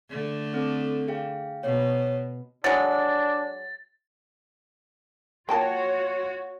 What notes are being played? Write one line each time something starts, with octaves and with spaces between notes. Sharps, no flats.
D3 A3
C4 A4
G#4 F5 G5
B2 C#5
F#3 G#3 D4 A6
A#3 F4 F#4 C#5 G5 A5